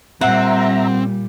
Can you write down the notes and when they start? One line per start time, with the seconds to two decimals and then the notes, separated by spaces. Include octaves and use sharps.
0.21 A#2 G3 C4 E5 F#5 A#5